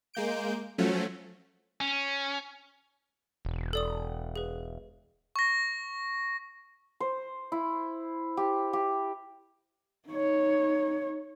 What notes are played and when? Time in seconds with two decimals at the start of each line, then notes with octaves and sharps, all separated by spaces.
0.14 G#3 A#3 G6 D7
0.78 F3 F#3 A3 C#4
1.81 C#4
3.45 E1
3.73 A4 D5 D#6
4.36 G#4 B4
5.36 C#6 A#6
7.00 C5
7.52 E4
8.37 G4
8.73 G4
10.08 D#4 C#5